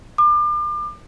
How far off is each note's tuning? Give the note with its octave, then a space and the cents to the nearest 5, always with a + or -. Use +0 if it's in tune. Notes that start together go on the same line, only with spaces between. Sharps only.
D6 +35